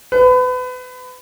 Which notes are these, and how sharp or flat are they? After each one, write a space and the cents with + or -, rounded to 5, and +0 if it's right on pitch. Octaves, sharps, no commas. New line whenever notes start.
B4 +30